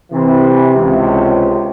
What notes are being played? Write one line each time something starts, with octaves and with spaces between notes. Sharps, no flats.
C3 E3
C#2 C3